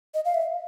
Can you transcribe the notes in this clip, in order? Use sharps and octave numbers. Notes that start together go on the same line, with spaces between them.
D#5
F5
E5